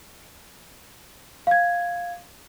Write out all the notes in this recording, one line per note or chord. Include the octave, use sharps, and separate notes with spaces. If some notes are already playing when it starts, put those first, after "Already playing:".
F5 G#6